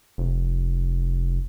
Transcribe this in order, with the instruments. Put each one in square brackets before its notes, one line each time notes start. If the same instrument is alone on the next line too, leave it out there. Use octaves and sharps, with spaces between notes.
[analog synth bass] F1